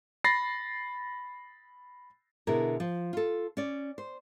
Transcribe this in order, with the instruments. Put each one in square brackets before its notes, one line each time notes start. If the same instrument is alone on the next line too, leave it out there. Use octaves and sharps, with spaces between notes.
[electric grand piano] B5 A6 A#6 C7
[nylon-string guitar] B2 D3 E4 G#4 A#4
F3
F4 A4
C#4 D5
C5